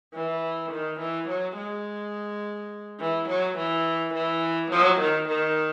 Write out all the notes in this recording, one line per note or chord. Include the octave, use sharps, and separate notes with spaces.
E3
D#3
E3
F#3
G#3
E3
F#3
E3
E3
F#3
D#3
D#3